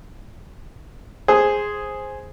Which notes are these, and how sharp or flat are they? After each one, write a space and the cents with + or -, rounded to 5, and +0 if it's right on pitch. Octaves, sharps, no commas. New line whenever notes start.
G#4 +0 C5 +5